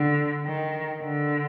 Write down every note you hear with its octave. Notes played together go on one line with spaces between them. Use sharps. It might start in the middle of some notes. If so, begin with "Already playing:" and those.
Already playing: D3
D#3
D3